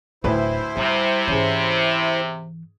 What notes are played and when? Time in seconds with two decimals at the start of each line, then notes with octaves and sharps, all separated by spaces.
0.24 D1 D2 A2 D#4 E4 B4 C5
0.77 C3 G3
1.28 G#2 E3 C#4 G#4